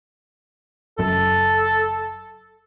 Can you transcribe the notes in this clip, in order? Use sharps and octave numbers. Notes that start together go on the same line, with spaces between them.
F#1 F#2 A4